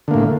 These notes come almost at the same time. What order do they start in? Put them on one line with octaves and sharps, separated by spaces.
D3 A#3 A2